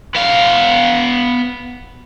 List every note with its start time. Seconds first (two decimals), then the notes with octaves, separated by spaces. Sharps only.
0.15 B3 F5